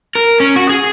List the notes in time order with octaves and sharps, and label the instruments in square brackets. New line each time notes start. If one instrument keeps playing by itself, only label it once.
[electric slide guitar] A#4
C#4
F#4
G#4